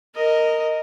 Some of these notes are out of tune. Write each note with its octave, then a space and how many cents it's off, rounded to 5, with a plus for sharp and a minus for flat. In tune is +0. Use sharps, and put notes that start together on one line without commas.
A#4 -10 D#5 +0